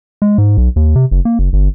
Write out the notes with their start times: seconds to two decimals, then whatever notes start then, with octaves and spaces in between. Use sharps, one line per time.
0.22 G#3
0.38 G#2
0.57 B1
0.76 D#2
0.96 C3
1.11 F#1
1.25 A#3
1.39 F#1
1.53 G1